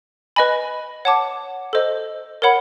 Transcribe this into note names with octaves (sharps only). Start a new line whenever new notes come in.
B4 D#5 G#5 B5
C#5 F#5 A5 D6
A4 C5 D#5
A#4 C#5 F#5 B5